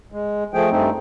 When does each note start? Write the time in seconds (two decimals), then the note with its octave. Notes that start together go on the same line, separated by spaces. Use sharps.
0.12 G#3
0.54 F3 A3 G#4 G5
0.70 G2 A3 C4 D#4